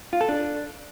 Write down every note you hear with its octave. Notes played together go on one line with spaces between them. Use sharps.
F4
A4
D4